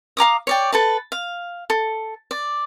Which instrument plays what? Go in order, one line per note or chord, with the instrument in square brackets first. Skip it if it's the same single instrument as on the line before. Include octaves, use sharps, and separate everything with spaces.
[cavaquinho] F5 A#5 D6 D#6
C#5 D5 G5
A4 B4 A5
F5
A4
D5